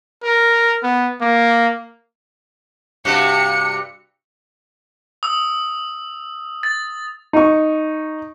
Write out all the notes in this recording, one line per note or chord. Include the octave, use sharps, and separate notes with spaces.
A#4
B3
A#3
G2 C3 F#4 C#7
D#6 E6
A6
D#4 C#6